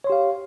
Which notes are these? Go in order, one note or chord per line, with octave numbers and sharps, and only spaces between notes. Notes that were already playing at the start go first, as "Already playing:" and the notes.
G4 C#5 F5 C6